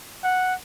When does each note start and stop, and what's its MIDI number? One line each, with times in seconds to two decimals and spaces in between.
0.24 0.54 78